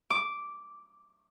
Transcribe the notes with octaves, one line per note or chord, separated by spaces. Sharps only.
D6